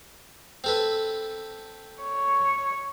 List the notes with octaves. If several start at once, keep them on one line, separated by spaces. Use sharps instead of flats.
C4 A4 B4
C#5